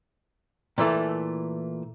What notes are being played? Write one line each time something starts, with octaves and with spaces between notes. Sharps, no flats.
A#2 E3 A3 A4